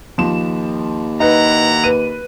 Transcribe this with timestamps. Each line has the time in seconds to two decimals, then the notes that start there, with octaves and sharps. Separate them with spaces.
0.18 D#2 F3 E7
1.20 D#4 E4 B4 F#5 A#5
1.84 B4 D#7